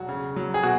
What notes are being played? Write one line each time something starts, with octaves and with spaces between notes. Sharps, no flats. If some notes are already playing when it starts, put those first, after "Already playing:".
Already playing: E1 F#3 F#4
C#3
F#3
G#4
B2 F#4